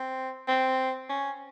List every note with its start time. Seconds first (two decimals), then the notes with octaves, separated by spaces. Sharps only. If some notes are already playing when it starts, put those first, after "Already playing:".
Already playing: C4
0.48 C4
1.09 C#4